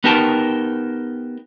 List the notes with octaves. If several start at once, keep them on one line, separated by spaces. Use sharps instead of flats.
B3 D#4 G4 A#4 G5 A5